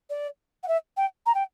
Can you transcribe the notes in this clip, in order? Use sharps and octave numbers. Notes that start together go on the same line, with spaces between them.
D5
F#5
E5
G5
A#5
G5